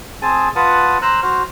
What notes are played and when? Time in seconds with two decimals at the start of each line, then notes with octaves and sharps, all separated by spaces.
0.22 C4 G#4 A5 D#6
0.56 F4 B4 F#5 A5 D#6
1.02 C5 A#5 E6 F#6
1.23 F#4 C5 F6